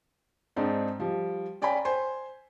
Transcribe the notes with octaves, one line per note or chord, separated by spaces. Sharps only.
G#2 C4 D4 D#4
F3 G3
C#4 D5 G5 G#5 A#5 B5
C5 G#5 C6